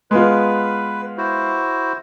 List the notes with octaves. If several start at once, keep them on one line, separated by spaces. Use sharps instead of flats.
G#3 B3 F4 B4
E4 F#4 C5